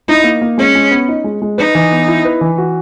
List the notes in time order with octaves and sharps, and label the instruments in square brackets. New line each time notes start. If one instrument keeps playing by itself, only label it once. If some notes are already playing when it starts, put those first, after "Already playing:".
[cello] D#4 [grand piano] E4
[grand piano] A#3
A#3
[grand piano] G#3 [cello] C#4
[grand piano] G#3
B3
D#4
G#3
G#3
[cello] D#4 [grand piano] B4
[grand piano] E3
B3
E4
B4
E3
F#4